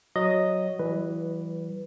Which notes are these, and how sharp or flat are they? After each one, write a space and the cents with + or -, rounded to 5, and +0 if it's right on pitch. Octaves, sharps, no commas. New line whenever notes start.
F#3 +0 D#5 +0
E3 +10 G3 -40 B4 +0